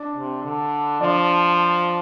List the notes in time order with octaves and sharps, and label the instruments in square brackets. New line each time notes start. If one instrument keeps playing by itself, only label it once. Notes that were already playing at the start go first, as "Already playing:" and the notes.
Already playing: [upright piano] D4 D5
[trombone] C3
D3
[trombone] F3 [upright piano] D4 D5